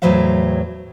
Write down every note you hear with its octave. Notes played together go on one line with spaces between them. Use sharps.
E2 A2 F#3 B4 C5 F5